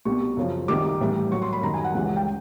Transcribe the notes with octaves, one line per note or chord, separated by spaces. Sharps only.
C2 B2 G3 C#6
F#2 C#3 F3
C2 C3 D#3 G3 D6
A2 E3 G3
A2 F#3 C#6
C6
B5
F#2 D#3 G3 A#5
G#5
F#5
C#2 C#3 E3 G3 F#5
F#5
G5